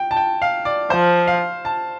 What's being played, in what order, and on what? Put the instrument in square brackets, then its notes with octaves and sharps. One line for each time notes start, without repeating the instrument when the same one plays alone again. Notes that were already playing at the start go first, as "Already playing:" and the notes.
Already playing: [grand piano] G5
A5
G5
F5
D5
[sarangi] F3 [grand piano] C5
[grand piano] F5
A5